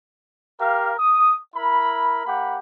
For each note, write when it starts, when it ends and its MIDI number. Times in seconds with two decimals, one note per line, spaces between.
0.61 0.93 67
0.61 0.93 70
0.61 0.93 77
0.99 1.37 87
1.56 2.22 64
1.56 2.22 70
1.56 2.22 83
2.26 2.58 58
2.26 2.58 67
2.26 2.58 78
2.26 2.58 83